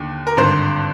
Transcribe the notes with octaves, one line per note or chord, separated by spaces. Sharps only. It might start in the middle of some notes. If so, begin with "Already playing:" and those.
Already playing: D#2 D3
A#4
G#1 G2 D3 C5